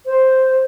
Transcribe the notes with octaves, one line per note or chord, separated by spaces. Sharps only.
C5